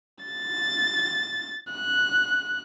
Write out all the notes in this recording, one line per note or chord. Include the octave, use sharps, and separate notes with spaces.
A6
F#6